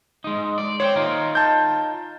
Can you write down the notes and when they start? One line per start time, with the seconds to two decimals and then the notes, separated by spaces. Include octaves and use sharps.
0.24 G#3 D#4
0.58 D5
0.80 C5 C#5 F#5 G5
0.96 D#4 F4 A#4
1.35 A5 G6